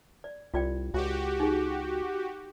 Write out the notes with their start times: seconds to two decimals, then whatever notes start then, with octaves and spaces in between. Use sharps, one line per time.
0.24 D5
0.54 C2 F4 D5 G5
0.94 C#2 F#4 G4
1.40 D#4 G#4